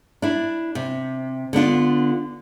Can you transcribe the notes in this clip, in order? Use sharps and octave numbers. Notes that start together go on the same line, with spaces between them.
D4 E4
C3
D3 B3 D4 F4